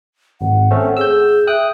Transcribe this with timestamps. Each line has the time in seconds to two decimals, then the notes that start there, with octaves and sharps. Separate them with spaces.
0.41 G#1 F#5
0.71 A3 C4 C#4
0.97 G#4 E6 G6
1.47 E5 G5 D#6 F#6